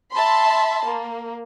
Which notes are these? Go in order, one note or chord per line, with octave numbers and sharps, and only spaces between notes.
E5 A5 B5 C6
A#3